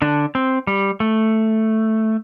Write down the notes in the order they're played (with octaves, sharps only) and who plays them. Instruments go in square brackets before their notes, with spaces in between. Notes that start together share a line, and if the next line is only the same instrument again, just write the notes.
[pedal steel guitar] D3 D4
C4
G3
A3